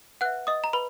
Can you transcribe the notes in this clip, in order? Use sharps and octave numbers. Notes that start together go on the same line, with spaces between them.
B4 E5 F#5 F#6
D#5 D#6
A#5
B4 B5